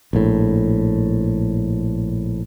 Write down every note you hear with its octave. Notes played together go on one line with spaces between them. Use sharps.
A#1 A2